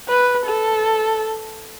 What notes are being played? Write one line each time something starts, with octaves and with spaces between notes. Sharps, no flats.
B4
A4